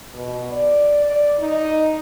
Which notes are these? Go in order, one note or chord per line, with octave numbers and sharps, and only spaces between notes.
B2
D5
D5
D#4